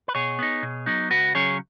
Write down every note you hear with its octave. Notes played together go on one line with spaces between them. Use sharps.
B4
B2 G#4 C#5
B3 D#4
B2
F#3 B3 D#4
C#2 F#4 B4
C#3 F#3 C#4 G#4 C#5